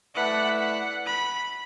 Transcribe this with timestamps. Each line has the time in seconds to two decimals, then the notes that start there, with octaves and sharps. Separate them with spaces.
0.15 A3 E4 B4 D5 F#5
0.60 F#5
1.06 B5